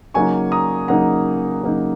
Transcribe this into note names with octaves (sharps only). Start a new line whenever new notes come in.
C#3 F#3 A#3 D#4 G#5 C#6
A#5 D#6
C#3 F#3 A#3 D#4 F#5 A#5
C#3 F#3 A#3 D#4